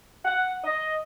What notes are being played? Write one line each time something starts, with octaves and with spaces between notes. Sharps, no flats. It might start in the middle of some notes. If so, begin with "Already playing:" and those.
F#5
D#5